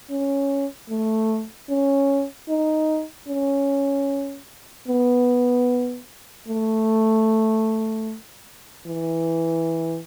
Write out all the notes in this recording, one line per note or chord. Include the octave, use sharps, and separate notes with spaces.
C#4
A3
C#4
D#4
C#4
B3
A3
E3